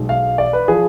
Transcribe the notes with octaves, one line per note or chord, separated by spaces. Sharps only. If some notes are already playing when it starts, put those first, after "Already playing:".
Already playing: B1 B2 G#3
F5
D5
B4
F3 G#4